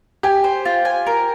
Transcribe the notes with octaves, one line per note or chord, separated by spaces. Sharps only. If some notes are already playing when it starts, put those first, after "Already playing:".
G4 G#5
C5
F4
G#5
A#4